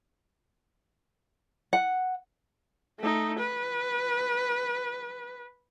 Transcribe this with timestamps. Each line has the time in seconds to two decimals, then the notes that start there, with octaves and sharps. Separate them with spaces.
1.73 F#5
3.00 A3 D#4
3.39 B4